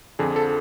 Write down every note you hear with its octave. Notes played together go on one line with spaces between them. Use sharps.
F2 D3 F3 G#4
A4